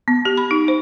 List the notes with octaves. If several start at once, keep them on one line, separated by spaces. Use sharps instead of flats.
B3
G4
B5
D#4
C5